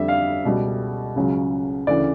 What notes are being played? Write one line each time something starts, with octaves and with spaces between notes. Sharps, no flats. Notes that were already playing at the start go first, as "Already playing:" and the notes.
Already playing: F2 D3 G3 E5
F5
C#2 B2 G3
C#2 C#3 F#3
D2 C#3 E3 D5